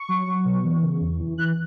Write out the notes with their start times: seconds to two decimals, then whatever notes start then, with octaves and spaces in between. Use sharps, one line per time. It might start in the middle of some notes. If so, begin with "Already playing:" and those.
Already playing: C#6
0.09 F#3
0.27 F#3
0.45 B2
0.64 E3
0.82 C#3
1.01 E2
1.19 E3
1.38 E3 F#6